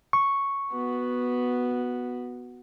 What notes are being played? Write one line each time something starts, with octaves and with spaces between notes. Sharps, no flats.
C#6
B3 F#4